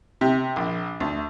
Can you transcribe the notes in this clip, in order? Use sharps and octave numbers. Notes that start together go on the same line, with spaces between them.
C3
A#1
D2